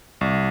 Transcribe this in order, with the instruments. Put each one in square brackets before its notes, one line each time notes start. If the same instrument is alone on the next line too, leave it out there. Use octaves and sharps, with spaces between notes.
[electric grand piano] C2